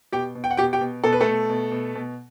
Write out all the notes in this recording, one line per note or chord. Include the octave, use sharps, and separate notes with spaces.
B2 G4 G5
B2
G5
F#5
B2 G4 G5
G4 G5
B2
B2 A4
B4
A3 A4
B2
B2
B2
B2